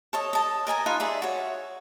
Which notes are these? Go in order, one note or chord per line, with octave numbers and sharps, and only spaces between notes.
A4 C#5 D#5
D#5 A5
A#4 D#5 G#5 A#5
D#4 F4 A#4 B4
G#4 D5 E5
F#4 C#5